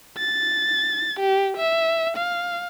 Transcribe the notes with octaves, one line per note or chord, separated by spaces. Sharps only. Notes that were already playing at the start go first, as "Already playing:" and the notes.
A6
G4
E5
F5